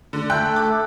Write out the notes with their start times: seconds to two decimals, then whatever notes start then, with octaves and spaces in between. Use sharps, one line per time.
0.13 D3
0.30 A3 A4 G5 F#6
0.56 D6